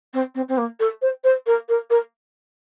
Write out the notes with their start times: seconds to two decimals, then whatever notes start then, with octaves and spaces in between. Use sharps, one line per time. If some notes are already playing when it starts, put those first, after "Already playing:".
0.14 C4
0.35 C4
0.48 C4
0.58 A#3
0.80 A4
1.02 C5
1.24 C5
1.46 A#4
1.69 A#4
1.90 A#4